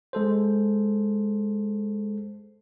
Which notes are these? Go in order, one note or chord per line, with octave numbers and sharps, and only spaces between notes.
G#3 A4 C5